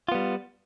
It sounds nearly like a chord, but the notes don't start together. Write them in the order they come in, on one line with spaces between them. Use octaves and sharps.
F4 B3 G3